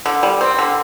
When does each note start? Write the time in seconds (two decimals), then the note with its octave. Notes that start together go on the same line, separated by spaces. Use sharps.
0.06 D3
0.23 G3
0.41 C4
0.59 D3